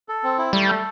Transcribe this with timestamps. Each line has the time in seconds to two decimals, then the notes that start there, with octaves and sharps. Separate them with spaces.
0.09 A4
0.24 C4
0.38 E4
0.53 G3 A3
0.68 A4